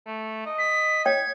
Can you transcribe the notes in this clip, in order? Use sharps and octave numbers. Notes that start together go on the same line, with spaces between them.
A3
D#5
B6
C#5 G5 G#6